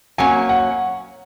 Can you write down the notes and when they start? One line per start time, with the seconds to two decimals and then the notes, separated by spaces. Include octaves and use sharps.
0.18 F#3 A#3 C#4 G#5
0.49 F#5